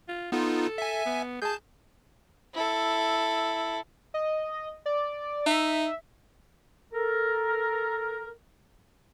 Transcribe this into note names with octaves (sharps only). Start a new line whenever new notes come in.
F4
B3 D#4 F4 A4
E5 G#5
B3
G#4 A5 G6
E4 A4
D#5
D5
D#4 E5
A4 A#4